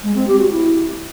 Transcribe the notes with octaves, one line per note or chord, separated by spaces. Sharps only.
G#3
C4
G4
F#4
E4